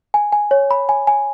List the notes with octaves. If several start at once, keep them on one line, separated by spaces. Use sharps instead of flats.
G#5
G#5
C#5
B5
G#5
G#5